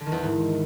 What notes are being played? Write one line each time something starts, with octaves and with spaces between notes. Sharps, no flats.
D3
D#3
E2
D#3
G#2